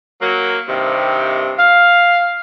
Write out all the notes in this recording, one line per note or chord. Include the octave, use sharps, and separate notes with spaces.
F#3 A#3
G2 C3 D#3
F5